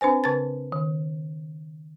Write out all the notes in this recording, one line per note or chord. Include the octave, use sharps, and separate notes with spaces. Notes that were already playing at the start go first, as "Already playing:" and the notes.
C4 D4 B4 C5 G#5
C#3 B4 A5 A6
D#3